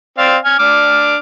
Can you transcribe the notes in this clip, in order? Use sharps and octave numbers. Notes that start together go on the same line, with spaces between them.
C4 D5 F5
G#5 F6
D4 D6 F6